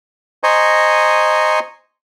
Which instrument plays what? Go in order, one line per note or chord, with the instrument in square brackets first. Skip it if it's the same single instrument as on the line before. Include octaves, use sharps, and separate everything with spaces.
[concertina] C5 D#5 G#5 A#5 C#6